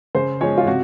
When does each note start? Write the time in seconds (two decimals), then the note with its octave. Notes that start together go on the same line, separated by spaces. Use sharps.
0.15 C#3 C5
0.41 F3 G#3 C#4 C#5
0.57 F4
0.66 C3 F#4